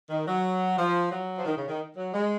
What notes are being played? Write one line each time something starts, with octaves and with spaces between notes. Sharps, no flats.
D#3
F#3
F3
F#3
F3
D#3
C#3
D#3
F#3
G#3